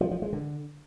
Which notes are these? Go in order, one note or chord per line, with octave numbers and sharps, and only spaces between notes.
F3
F3
G#3
D3